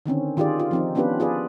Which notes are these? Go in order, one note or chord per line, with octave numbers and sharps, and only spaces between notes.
D3 D#3 C4 C#4
D#3 F4 G4 G#4 D5
F4
F3 C4 D#4
B3 C#4 D4 F4 G4 B4
F4 G#4 B4 D5